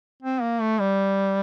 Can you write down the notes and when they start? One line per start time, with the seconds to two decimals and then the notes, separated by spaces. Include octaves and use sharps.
0.22 C4
0.42 A#3
0.61 A3
0.80 G3